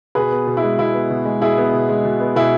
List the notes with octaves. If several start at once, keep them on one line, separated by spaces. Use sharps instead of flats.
B2 G#4 B4
B3
B2
E4
G#3
B2 E4
B3
B2
G#3
B2 E4 G#4
B3
B2
G#3
B2
B3
B2 E4 G#4